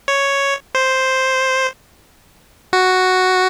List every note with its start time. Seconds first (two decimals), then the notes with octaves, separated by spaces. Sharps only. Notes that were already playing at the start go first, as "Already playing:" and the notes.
0.08 C#5
0.75 C5
2.73 F#4